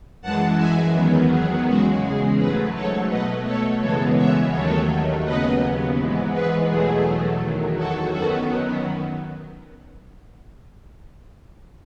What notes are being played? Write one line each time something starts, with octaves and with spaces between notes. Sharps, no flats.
F#2 E3 G#3 F#5 A5
E5 G#5
E2 D#3 F#3 B3
G#4
E2 C#3 G#3 F#4
G#4
G#2 F#3 A3 G#4 B4
A4 C#5
B2 A3 B4 D#5
A4 C#5
F#2 C#3 E3 G#3 B3 A4 C#5
C#5 E5
D#2 D#3 F#3 A3 A4 C#5
D#2 C#3 F#3 B3 B4 D#5
G#2 E3 G#3 B3
G#4 B4
E2 B2 F#3 A3 G#4
E2 D#3 F#3
F#4 A4
F#2 D#3 F#3 B3 F#4 A4